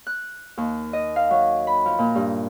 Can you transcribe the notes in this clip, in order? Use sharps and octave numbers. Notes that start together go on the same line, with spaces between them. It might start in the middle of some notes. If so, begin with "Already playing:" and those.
F#6
D#2
D#5
F5
F#3
B5
F3
A#2
G2